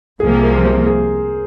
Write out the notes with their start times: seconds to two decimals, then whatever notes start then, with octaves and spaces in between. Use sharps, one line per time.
0.20 C2 C3 F3 A#3 G#4
0.43 A#4
0.65 C5
0.86 G#4